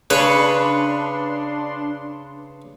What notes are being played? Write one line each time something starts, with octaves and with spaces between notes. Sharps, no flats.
C#3 D4 B4 C#5 C6